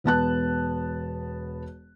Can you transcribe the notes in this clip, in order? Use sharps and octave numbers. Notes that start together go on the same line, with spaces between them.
E1 B3 A5 F#6